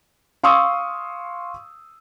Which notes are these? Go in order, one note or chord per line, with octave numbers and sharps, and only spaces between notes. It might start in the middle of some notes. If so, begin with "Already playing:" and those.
F5 C6 C#6 D#6 E6